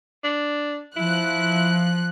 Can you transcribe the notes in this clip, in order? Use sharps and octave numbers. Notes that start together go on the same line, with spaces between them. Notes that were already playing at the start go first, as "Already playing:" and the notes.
D4
F3 E4 F#6